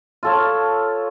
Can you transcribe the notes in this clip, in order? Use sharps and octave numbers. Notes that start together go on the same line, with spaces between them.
F4 A4 C#5